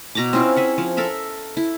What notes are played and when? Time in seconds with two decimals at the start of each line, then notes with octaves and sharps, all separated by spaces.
0.15 B2 A#5 B5 D6
0.33 C4 C#4 E4 F4
0.56 G#4 E5 F#5
0.78 F3
0.97 A4 A#4 E5 B5
1.57 E4